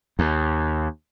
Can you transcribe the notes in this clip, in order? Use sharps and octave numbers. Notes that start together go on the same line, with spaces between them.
D#2